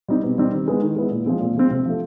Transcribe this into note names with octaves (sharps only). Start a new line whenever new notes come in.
G3 C4 D#4
B2
G3 C4 D#4
D#3
G#3 B3 E4
D#3
G#3 B3 E4
A#2
F3 G#3 C4
A#2
F3 G#3 C4
C3
F3 A3